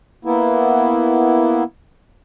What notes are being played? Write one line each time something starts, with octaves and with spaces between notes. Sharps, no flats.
A#3 B3 E4